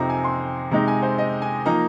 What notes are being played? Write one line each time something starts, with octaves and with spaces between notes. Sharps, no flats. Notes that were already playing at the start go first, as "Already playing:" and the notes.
Already playing: F2 C3 F3 C4 D#4 A#5
G#5
C6
C3 G#3 D#4 A#5
G#5
C5
D#5
G#5
F3 A#3 D#4 A#5